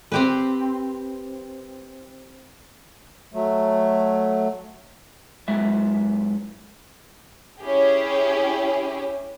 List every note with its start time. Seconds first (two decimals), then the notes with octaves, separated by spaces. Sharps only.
0.12 C4 G4 B4
3.34 F#3 A3
5.48 F#2 G#3 E5
7.61 C#4 E4 G4 G#4